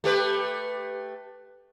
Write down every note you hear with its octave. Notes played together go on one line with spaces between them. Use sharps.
A3 G4 B4